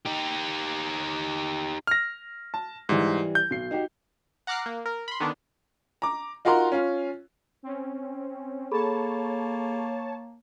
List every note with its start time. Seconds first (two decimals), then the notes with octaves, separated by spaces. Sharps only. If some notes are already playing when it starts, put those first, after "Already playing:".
0.05 D#4 G4
1.87 F6 A#6
2.54 A5
2.89 G#2 E3 G3 E4
3.35 G6
3.51 B1 C7
3.71 D#4 F#4 G4
4.47 F#5 A#5 D6 F6 F#6 C7
4.66 A#3
4.86 A#4
5.08 B5 C6
5.20 D3 D#3 B3 D4
6.02 A#5 D6
6.45 D#4 F4 F#4 A#4 A#5 C6
6.72 C#4 F4
7.63 C4 C#4
8.72 A#3 G#4 A4 C#5 A5 B5